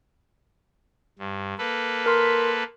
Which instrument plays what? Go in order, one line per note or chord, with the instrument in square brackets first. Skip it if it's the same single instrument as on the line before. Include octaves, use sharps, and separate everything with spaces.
[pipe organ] G2
A#3 A4 B4
[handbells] A#4 C6 B6